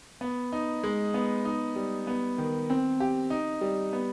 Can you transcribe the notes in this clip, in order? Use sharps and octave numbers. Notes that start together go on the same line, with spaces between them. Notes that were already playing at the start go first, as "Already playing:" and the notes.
B3
D#4
G#3
B3
D#4
G3
B3
D#3
C4
G4
D#4
G3
B3